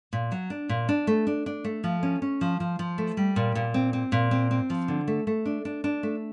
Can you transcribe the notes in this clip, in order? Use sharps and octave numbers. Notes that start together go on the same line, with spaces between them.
A#2
F#3
D4
A#2
D4
A3
D4
D4
A3
F3
C#4
C#4
F3
F3
F3
A3
G3
A#2
A#2
C4
C4
A#2
C4
C4
F3
D3
A3
A3
D4
D4
D4
A3